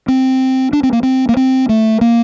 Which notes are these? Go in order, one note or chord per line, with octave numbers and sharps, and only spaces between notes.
C4
D4
C4
A#3
C4
A#3
C4
A3
A#3